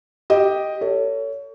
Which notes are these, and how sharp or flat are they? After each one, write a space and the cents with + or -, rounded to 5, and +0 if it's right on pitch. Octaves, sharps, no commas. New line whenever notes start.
G4 +0 D#5 +0
A4 +35 C#5 +25